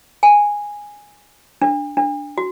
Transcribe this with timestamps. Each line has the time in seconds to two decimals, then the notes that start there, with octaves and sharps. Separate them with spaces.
0.23 G#5
1.62 D4
1.97 D4
2.38 F#4